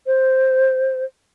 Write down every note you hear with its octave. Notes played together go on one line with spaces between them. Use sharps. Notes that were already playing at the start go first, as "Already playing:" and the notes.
C5